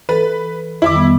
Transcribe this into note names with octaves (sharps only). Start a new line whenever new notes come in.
E3 A4 B4
F2 D#3 E4 E5 D6
G3 B3